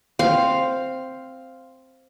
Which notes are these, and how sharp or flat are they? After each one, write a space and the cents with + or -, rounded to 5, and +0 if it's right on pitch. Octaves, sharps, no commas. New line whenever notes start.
C4 +0 F5 +0